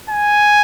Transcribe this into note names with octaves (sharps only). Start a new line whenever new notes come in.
G#5